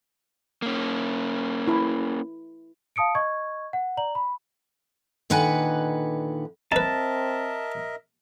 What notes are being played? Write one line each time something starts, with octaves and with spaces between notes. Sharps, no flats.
A#3 C#4
E4
F5 A5 D#6 C#7 D7
D#5 C#6 G#6
F#5
D5 A#5 F#7
B5
A#2 D3 D#3 B4 F#5 G#5
C4 D#4 A#4 B4 D#5 E5 A5